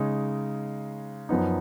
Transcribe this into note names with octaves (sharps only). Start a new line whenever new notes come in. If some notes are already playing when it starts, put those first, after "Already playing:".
Already playing: C#3 G#3 D#4
F#2 F3 B3 D#4